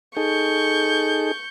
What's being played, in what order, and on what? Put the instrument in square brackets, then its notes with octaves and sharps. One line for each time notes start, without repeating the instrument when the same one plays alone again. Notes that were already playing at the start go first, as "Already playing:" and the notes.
[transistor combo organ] D#4 G#4 A4 [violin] C#6 G6